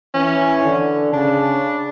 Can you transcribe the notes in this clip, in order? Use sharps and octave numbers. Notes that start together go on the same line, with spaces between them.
E3 C#4
D3
C#3 D4